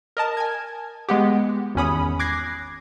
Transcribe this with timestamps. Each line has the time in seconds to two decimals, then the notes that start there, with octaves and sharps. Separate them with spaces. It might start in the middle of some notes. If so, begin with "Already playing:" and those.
0.17 A#4 D#5 A5
0.37 G#5 G#6
1.09 G#3 B3 G4
1.75 G#1 E2 C#4 B5 D#6
2.19 D6 F#6 G#6 A#6 C7